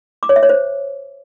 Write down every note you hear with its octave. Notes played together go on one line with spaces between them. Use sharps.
D6
C#5
E5
C#5
C5